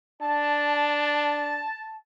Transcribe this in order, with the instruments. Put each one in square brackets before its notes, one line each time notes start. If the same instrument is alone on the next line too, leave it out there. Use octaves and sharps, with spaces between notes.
[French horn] D4 [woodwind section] A5